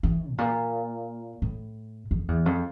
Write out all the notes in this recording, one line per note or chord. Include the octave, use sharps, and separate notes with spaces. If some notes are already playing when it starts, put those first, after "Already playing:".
E3
A2
A#2
A2
F2
E2
F2